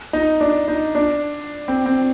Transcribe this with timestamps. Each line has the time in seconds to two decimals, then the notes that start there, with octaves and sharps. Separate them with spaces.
0.13 D#4
0.41 D4
0.68 D#4
0.95 D4
1.68 C4
1.86 C4